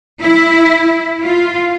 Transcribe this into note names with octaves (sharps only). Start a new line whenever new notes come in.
E4
F4